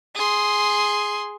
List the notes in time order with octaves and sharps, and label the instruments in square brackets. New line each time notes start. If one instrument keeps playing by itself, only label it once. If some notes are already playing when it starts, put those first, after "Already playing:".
[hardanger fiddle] G#4 C6